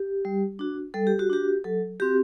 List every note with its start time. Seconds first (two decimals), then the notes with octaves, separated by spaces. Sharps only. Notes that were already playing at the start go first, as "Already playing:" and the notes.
Already playing: G4
0.25 G3
0.59 D4 F#4
0.94 G3 A4
1.07 G4
1.19 F#4
1.30 D4 F#4 G4
1.64 F#3 A4
2.00 C4 F#4 G4